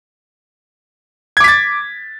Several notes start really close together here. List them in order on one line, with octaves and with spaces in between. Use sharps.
G#6 D6 B6 A6